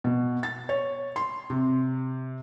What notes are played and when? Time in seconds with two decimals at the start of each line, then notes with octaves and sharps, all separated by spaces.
0.04 B2
0.43 A6
0.69 C#5
1.16 C6
1.50 C3